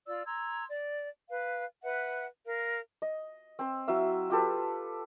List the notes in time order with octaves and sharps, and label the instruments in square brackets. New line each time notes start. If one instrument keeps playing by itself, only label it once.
[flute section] F4 D5 E6
A#5 C6 E6 G#6
D5
B4 F5
B4 E5 F#5
A#4 F5
[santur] D#5
C4 C5
F#3 E4 E5 F5
F4 G4 A4 B4